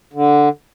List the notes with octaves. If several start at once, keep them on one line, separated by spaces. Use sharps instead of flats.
D3